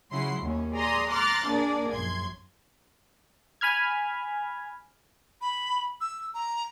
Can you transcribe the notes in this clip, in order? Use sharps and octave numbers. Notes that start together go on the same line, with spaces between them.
C#3 F#3 E4 F#5 C6 C7
D#2 C#4
G#4 D5 A#5 C6 D#6
A#5 C6 D6 F6 F#6 A6
A#3 D4 G#4 A#4 D5
A#1 F#2 C6 G#6
G#5 B5 F6 G#6
B5
E6
A#5